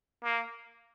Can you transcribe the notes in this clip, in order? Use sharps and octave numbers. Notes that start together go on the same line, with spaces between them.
A#3